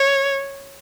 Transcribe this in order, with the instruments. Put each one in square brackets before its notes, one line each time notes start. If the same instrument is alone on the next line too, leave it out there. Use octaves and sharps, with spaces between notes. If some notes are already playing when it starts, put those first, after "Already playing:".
Already playing: [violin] C#5